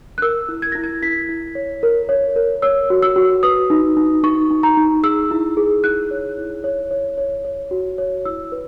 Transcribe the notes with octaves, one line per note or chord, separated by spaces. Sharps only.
F#6
A#4 E6
E4
G#6
E4 A#6
G#6
E4 B6
E4
C#5
A#4
C#5
A#4
C#5 E6
F#4
E6
F#4
B4 D#6
D#4
D#4
D#4 C#6
D#4
A#5
D#4
G#4 E6
E4
G#4
E4 F#6
C#5
E4
C#5
C#5
C#5
C#5
F#4
C#5
E4 E6
B4